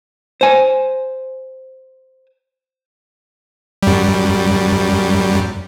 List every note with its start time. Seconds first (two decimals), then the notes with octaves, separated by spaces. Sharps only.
0.41 C5 G#5
3.83 F#2 G3